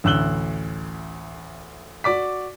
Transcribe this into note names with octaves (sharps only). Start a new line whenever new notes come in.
A1 D2 E6 F#6 F#7 G7
F#4 D5 D6 B6